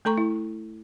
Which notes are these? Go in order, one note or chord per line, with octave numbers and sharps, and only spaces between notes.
A3 A4 A#5 C#6
E4